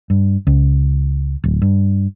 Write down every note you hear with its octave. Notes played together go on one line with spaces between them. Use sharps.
G2
C#2
D1
G2